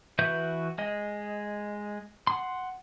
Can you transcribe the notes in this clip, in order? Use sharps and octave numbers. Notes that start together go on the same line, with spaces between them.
E3 F#4 B4 E5 G6
G#3 D#5
F#5 C6